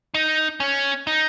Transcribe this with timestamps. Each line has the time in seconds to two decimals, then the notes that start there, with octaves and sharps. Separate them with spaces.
0.14 D#4
0.60 C#4
1.07 D#4